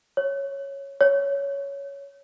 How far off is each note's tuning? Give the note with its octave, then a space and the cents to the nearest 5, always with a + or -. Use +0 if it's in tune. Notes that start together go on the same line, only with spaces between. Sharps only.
C#5 -5
C#5 +10